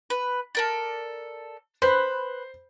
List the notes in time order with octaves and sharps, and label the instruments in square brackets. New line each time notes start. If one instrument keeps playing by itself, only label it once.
[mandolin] B4
A4 A#4 D5
[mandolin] B4 [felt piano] C5